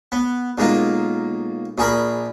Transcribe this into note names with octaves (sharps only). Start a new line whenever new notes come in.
B3
B1 G#3 A#3 F4
A#1 G#4 A#4 B5